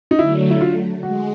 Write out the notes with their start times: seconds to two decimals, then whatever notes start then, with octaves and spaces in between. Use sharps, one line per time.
0.11 D#4
0.18 D3 F#3 A3 E4
0.50 E4
0.61 F4
1.03 G#3 F#4